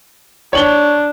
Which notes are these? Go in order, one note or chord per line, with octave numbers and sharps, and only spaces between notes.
D4 C#5 F#7 G7